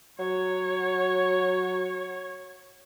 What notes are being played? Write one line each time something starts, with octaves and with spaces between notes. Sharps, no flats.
F#3 C#5